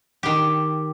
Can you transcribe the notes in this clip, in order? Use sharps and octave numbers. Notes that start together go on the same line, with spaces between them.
D#3 G4